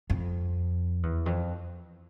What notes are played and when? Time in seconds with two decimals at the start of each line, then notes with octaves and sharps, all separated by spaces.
0.10 F2
1.03 E2
1.26 F2